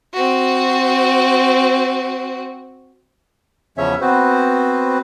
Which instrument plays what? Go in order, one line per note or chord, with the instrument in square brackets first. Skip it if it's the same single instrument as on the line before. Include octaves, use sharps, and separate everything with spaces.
[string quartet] C4 F#4
[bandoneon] E2 C#3 F3 C#4 C#5 E5
B3 C4 F#4 B4 C5